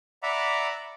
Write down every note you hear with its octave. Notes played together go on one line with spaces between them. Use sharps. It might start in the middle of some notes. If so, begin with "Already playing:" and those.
D5 E5 F#5 A#5 B5 D6